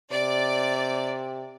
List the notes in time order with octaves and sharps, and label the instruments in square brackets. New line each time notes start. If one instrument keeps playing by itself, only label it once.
[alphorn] C3 [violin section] D5